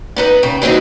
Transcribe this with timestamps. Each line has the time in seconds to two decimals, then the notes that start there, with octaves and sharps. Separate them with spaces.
0.16 B3 D#4 B4
0.43 C#3 G5
0.62 D#2 E3 C4 D#4 F#4